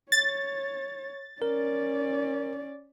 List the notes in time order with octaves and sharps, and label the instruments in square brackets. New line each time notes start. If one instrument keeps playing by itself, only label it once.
[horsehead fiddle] C#5 [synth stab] A6
[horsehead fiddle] C#4 D5 [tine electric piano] A#4